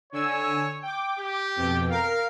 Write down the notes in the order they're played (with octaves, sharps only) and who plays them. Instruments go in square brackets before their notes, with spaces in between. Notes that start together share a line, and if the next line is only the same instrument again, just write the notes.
[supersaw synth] D3 G#5 E6 [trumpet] C#5
[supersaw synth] G5 D6
[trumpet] G4
[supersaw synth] F2 B2 G5
[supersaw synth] A#4 [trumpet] F5